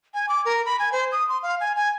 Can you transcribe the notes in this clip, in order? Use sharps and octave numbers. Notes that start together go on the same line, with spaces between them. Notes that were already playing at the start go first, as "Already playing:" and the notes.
G#5
D6
A#4
B5
G#5
C5
D#6
C6
F5
G#5
G#5